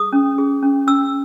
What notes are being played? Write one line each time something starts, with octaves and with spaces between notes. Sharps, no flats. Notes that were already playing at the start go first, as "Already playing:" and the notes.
Already playing: G#4 D#6
C#4
G#4
C#4
C#4 E6